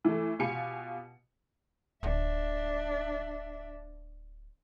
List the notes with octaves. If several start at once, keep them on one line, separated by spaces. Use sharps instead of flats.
E3 A3
B2 B3 F4 G4 G#5 C#7
D1 D4 E5